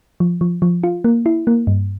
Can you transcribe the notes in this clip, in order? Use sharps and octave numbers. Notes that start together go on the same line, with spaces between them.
F3
F3
F3
F4
A#3
E4
A#3
G2